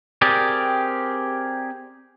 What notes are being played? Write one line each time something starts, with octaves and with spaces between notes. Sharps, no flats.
C4 G4 G#4 A#4 D5